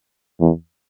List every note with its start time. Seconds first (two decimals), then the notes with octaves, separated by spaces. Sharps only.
0.41 E2